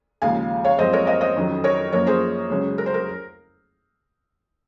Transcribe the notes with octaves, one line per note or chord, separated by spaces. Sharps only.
D#2 C#3 F3 G#3 F5 G#5
C#5 F5
F#2 F3 G#3 C4 C5 D#5
A#4 C#5
C5 D#5
C5 D#5
F2 D#3 F#3 C#4
A#4 C#5
F#2 F3 A#3 C#4 A#4 C#5
G#4 C5
C#2 C#3 F#3 C#4
A#4
C5
A#4